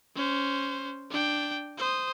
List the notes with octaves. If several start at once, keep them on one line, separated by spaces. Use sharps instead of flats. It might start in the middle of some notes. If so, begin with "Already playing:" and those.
C#4 C5
D4 G5
C5 D#6